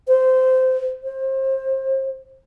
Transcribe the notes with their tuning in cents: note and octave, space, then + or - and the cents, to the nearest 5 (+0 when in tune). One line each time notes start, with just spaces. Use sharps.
C5 -15
C5 +30